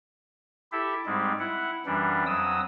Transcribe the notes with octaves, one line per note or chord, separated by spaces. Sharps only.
E4 G4 A4 E5
G#2 G3 G#3 C4
E4 F#5
F#2 E3 G3 D4
F2 F#3 D#6 E6